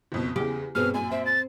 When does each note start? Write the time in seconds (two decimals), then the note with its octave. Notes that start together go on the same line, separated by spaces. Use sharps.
0.12 F#1 F2 B2
0.36 E2 C#3 G4
0.75 G2 B2 B3 C4 G#4 F6
0.94 F#2 A#2 G#5
1.12 C4 E5
1.26 A6